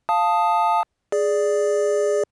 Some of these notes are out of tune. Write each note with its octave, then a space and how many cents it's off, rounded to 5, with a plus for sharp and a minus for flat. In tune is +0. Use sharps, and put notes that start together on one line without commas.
F5 +0 A5 +0 D#6 +0
G#4 +0 D5 +0